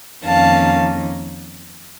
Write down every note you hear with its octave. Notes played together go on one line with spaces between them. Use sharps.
F2 D#3 A#3 C#4 F5 A5